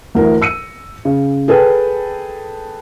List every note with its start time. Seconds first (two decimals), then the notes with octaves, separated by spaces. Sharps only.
0.15 D2 E3 A#4
0.42 E6 C#7 D#7
1.05 C#3
1.48 G#4 A4 B4 G5